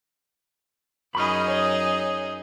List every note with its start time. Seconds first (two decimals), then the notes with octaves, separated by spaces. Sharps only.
1.15 F#2 D#4 G#4 B5 C#6 F6
1.48 C#5